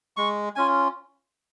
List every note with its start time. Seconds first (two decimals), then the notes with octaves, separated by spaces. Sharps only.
0.17 G#3 C#6
0.56 C#4 F4 G#5